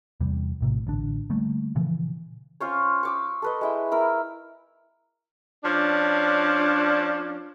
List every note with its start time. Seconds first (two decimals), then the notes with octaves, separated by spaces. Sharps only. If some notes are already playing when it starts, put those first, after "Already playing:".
0.20 E2 C3 G3
0.61 A#1 A2 C3
0.87 A1 D3 D4
1.30 D3 G3 A3 A#3
1.75 A#2 C#3 E3 F3
2.60 C#4 F4 C5 C#5
3.03 C#6 D6 E6
3.42 A4 B4 D#5
3.61 G#3 E4 G5
3.91 E4 A#4 E6
5.64 F3 C#4 D4